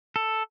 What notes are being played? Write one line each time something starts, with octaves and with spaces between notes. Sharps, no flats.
A4